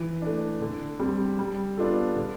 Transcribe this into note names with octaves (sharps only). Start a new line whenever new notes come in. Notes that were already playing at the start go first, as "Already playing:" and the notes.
Already playing: E3
A3 D4
D3
G3 C4 G4
G3
B3 D4 F4 A4
D3